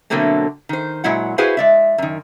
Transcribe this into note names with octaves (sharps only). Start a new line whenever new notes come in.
B2 D3 F#3 A3 A#3 C4
D#3 C5
A#2 F#3 G#3 E4 F#5
E4 F#4 G#4 B4 C5 F5
G#3 D5 E5
F#2 D#3